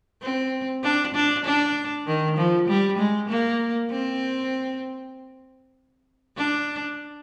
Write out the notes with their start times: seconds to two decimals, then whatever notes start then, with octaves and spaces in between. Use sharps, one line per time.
0.22 C4
0.83 D4
1.15 D4
1.45 D4
2.07 D#3
2.37 F3
2.68 G3
2.98 G#3
3.29 A#3
3.91 C4
6.37 D4